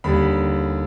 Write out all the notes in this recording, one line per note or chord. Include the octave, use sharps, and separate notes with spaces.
D#2 D3 G3 B5